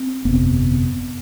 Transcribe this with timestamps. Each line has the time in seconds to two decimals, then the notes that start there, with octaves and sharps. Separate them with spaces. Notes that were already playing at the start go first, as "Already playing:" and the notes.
Already playing: C4
0.25 G1 F2 C3 B3